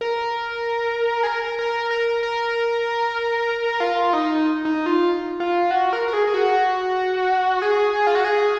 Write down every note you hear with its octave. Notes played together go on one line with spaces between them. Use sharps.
A#4
G#4
A#4
A#4
A#4
A#4
F4
D#4
D#4
F4
F4
F#4
A#4
A#4
G#4
G#4
F#4
G#4
F4
F#4
G#4